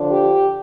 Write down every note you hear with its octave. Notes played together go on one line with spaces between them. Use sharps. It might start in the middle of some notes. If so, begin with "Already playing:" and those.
Already playing: D3 F3 D4
G4